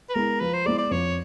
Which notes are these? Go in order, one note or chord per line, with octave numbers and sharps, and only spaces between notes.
B4
G#3 B3 E4 G#4 A#4
F3 B4
C5
G#3 B3 E4 G#4 D5
D5
F2 C#5